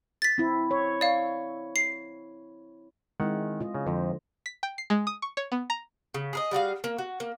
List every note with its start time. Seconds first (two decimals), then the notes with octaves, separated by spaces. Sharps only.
0.22 A6 B6
0.38 C4 E4
0.71 C#5
1.01 D5 F5
1.76 C7
3.20 D#3 G#3 C4 E4 F#5
3.61 F4 D#5
3.75 C#3
3.87 F2 D3 F3 C5
4.46 B6
4.63 G5
4.78 C7
4.90 G#3
5.07 D#6
5.22 C#6
5.37 C#5
5.52 B3
5.70 A#5
6.14 C#3
6.33 G#4 A#4 D#5
6.51 G3 F#4 G#4 F5
6.84 A#3
6.98 F#4
7.20 A#3